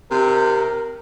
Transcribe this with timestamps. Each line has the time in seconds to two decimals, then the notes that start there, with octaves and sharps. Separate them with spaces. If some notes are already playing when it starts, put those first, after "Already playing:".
0.11 C3 A#4